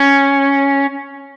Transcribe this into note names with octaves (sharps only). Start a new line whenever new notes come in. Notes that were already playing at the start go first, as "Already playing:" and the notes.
Already playing: C#4